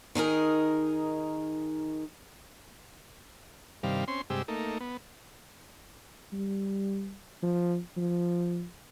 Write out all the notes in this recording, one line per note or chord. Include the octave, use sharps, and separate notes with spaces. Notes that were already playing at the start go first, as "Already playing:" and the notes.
D#3 D#4 G#4 A#4
G2 C3 D#3 G3 F5
C4 C#4 C6
G2 C3 G#3 G4 E6
A3 A#3 D#4
B3
G3
F3
F3